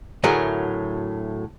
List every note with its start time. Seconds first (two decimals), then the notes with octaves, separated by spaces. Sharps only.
0.23 D2 A2 F#3 G#4 A#4